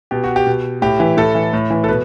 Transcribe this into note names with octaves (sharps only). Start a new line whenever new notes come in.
B2 G4
F#4
G4
B2
A2 G4
E3
A2 A4
E3
A2
E3
A4
B2 B4